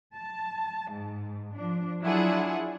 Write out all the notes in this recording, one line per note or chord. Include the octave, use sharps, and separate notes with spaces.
A5
G#2
F3 D4
F#3 D4 E4 F4 G#4 F#5